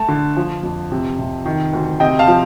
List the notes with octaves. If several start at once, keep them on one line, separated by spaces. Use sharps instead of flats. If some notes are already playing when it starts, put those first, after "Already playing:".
Already playing: A3 A5
D3
F3
F2
C3
C3
D#3
D2
C3 D#5 G5
F5 A5
F3